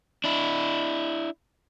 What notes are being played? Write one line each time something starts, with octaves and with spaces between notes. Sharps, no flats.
D4 E4